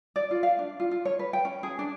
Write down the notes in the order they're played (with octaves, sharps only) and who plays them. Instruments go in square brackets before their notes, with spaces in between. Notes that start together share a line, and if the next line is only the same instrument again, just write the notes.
[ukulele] D5
F4
F5
D4
F4
F4
C#5
B4
G5
C#4
G#4
D4